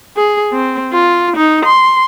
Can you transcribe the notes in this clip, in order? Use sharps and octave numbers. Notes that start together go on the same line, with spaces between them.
G#4
C4
F4
D#4
C6